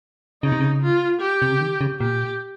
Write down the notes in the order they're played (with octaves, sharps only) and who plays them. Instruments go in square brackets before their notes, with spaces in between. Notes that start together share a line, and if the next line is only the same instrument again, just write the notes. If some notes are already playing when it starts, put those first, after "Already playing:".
[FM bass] C#3 [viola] D#4
[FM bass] C3
C#3
[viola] F4
G4
[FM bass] C3
C#3
D#3
C#3
[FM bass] A#2 [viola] G4